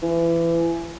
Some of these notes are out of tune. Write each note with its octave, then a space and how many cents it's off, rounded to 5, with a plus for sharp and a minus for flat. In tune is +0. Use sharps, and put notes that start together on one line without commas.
E3 +25